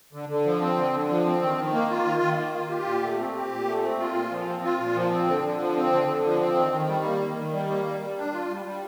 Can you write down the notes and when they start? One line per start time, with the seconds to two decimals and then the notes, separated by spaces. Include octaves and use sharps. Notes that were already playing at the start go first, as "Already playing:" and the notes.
0.13 D3
0.29 D3
0.46 F3
0.61 C4
0.77 D3
0.93 D3
1.09 F3
1.26 C4
1.42 D#3
1.57 D#3
1.73 A#3
1.90 F4
2.05 D#3
2.22 D#3
2.38 A#3
2.54 F4
2.70 G4
2.86 A#2
3.03 A3
3.19 C4
3.35 G4
3.51 A#2
3.67 A3
3.83 C4
4.00 F4
4.14 A#2
4.31 F3
4.47 C4
4.64 F4
4.79 A#2
4.95 F3
5.12 C4
5.27 D3
5.44 D3
5.60 F3
5.76 C4
5.92 D3
6.08 D3
6.25 F3
6.40 C4
6.56 D#3
6.72 D#3
6.88 G3
7.05 A#3
7.21 D#3
7.37 D#3
7.53 G3
7.69 A#3
7.85 G3
8.01 G3
8.18 D4
8.33 F4
8.49 G3
8.66 G3